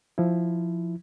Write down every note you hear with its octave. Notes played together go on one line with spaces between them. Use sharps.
F3 E4